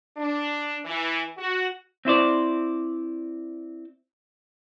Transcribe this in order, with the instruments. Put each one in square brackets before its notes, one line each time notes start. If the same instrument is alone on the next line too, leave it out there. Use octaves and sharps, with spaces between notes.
[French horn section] D4
E3
F#4
[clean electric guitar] C4 E4 C5 D5